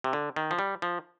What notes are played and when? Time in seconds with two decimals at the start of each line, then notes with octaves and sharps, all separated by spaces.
0.04 C3
0.13 D3
0.36 D#3
0.51 F3
0.59 G3
0.82 F3